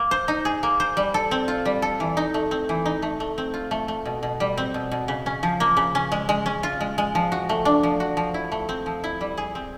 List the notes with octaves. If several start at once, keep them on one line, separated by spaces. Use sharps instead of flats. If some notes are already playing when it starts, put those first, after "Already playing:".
Already playing: A#3
C5
D#4
G#4
A#3
C5
G3
A4
C4
F4
G3
A4
E3
D#4
A3
C4
E3
D#4
A3
A3
C4
F4
A3
A3
B2
B2
G3
C4
B2
B2
C#3
C#4
F3
A#3
C#3
C#4
G#3
G#3
C#4
F4
G#3
G#3
F3
F#4
A3
D4
F3
F#4
F3
E4
A3
C4
F3
E4
G3
G#4
C4